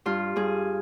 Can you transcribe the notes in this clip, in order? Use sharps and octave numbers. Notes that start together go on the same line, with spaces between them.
G2 F4
G2 G#4